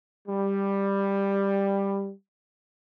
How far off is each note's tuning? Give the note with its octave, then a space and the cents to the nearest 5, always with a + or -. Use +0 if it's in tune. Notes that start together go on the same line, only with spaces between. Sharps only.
G3 +10